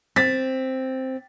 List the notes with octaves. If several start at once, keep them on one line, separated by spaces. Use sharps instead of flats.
C4 A6 B6